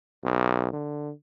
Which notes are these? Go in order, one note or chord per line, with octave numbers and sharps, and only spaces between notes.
B1
D3